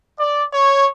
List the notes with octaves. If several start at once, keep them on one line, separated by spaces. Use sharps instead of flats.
D5
C#5